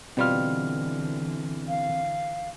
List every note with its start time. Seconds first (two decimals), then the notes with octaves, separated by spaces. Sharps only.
0.17 B2 D3 E3 G3 C4 F4 F6
1.68 F5